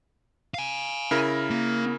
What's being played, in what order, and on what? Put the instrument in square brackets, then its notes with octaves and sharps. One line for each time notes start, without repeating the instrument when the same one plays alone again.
[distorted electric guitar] F5 G#5
[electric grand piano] C#3 E4 A#4
[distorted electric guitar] A#3